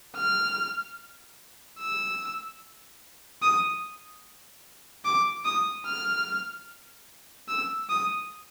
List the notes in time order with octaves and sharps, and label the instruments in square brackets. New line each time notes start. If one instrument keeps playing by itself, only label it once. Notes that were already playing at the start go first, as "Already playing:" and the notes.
[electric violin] F6
E6
D#6
D6
D#6
F6
E6
D#6